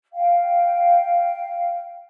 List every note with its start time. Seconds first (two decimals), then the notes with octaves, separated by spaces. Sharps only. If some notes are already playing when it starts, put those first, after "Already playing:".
0.13 F5 G5